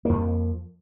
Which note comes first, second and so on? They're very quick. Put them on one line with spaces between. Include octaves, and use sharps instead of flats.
A#3 F2 F3